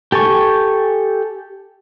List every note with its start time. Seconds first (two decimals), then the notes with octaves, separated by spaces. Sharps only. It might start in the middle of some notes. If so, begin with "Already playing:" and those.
0.12 G4 A4 G#5 C#6